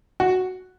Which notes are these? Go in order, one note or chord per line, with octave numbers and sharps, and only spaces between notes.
F#4